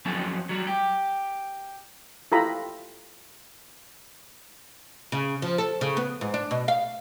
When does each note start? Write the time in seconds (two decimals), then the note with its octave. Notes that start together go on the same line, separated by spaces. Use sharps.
0.05 F2 F#3 C#4 F5 A5
0.49 F#3 G3
0.67 G4
2.32 E4 F4 G4 A4 A#5 B5
5.12 C#3
5.42 F3
5.58 A4
5.81 C#3
5.97 B3
6.21 G#2
6.34 D4
6.51 B2
6.68 F5